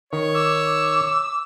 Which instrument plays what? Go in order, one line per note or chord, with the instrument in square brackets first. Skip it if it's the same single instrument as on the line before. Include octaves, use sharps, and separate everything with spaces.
[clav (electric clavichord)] D#3 [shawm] C#5
[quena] D6 [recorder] E6